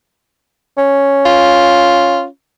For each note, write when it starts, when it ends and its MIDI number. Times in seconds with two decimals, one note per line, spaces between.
0.77 2.27 61
1.25 2.25 65